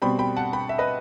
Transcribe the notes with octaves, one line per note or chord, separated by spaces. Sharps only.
B2 G3 C4 G5 B5
G5 B5
F#5 A5
G5 B5
E5
B4 D#5